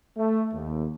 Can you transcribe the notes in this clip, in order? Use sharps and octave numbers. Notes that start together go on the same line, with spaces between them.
A3
D#2